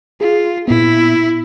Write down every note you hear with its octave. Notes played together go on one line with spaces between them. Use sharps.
F4 G#4
A#2 B3 E4